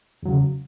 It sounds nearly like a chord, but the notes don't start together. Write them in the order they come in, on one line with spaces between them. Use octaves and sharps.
E2 F#3 C#3